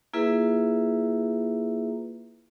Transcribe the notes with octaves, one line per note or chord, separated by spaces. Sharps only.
A#3 E4 F4 G#4 B4 E5